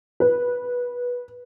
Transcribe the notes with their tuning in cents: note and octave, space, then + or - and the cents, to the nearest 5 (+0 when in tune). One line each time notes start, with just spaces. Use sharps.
B4 -15